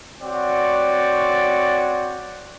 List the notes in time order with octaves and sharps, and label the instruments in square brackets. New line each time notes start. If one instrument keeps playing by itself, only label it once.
[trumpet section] C4 F#4 C#5 D5